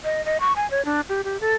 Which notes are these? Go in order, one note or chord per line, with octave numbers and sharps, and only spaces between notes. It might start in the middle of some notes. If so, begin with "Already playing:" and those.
D#5
D#5
C#6
G#5
C#5
D4
G4
G4
A4